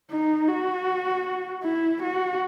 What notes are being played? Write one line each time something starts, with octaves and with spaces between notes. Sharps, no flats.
D#4
F#4
E4
F#4